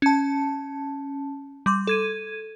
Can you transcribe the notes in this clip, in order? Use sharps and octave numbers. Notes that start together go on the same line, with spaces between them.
C#4 A5
G3 C6 D6
A4 G#6 D#7